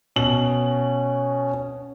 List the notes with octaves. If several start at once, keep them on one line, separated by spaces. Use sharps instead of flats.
B2 C#4 F#7